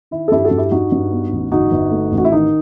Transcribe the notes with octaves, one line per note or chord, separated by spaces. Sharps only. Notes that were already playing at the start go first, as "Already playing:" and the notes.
D#3 E4
A4
G2 E4 G4
F#4 A4
G2
E4 G4
G2 D#4 F#4
G2
B3
A1
G1 D#4 F#4
G1
A3
A1
F#4
E4
D#3 D#4